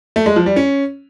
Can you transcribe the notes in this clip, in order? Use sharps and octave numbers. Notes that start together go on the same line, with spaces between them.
A3
G#3
F3
G3
C#4